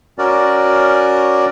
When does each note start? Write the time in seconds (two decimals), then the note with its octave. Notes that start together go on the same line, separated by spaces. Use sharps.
0.18 C#4 F#4 A#4 D5